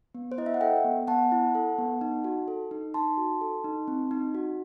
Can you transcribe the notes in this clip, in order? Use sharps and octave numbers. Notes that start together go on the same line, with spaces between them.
B3
C5
E4 D#5
E5
F#5
A4 E5 G5
B3
B3 F#5 A5
E4
A4
B3
D#4
F#4
A4
D#4
D#4 A5 C6
F#4
A4
D#4
C4
D#4
F#4